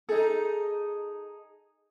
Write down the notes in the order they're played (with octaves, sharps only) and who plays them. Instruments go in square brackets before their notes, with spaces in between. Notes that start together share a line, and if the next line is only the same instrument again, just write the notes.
[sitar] D#4 G#4 [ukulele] A4